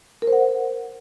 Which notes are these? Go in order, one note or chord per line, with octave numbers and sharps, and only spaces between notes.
A#4
C5
F#5